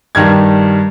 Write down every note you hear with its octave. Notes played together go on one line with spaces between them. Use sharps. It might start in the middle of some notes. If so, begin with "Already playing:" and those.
G2 D#3 G3 G#6